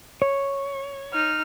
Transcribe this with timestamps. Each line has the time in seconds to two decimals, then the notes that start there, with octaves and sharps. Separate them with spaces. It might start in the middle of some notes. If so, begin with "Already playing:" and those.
0.22 C#5
1.13 D#4 F6